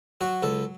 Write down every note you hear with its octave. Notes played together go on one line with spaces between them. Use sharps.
F#3 F#4
C#2 A4